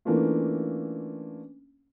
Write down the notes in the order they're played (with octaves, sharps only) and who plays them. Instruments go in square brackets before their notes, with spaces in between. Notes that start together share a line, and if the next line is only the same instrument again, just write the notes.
[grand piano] E3 A3 A#3 C#4 D4 F4